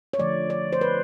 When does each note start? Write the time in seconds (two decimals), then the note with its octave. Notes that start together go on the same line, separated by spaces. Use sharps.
0.13 C#5
0.19 D3 F3 A3 D5
0.50 D5
0.73 C5
0.81 B4